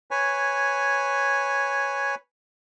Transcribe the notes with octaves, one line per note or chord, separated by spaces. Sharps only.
B4 C#5 G#5